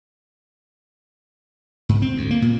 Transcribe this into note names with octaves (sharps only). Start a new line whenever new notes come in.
G#2
C4
D2
A#3
A#2